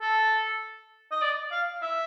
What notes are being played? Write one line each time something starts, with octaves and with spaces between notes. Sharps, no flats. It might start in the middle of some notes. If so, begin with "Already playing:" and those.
A4
D#5
D5
F5
E5